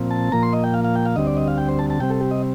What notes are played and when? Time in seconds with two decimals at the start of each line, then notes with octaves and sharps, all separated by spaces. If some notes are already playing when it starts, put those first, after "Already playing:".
Already playing: A#2 F3 C4
0.11 A5
0.32 A#2 F3 A#3 A#5
0.43 C6
0.53 D#5
0.64 G5
0.74 F5
0.84 F5
0.96 G5
1.06 F5
1.16 D2 D3 G3 C4 D#5
1.27 D5
1.37 D#5
1.48 F5
1.58 G5
1.69 C5
1.79 A5
1.90 A5
2.00 C3 G3 C4 G5
2.10 A4
2.21 G4
2.31 D#5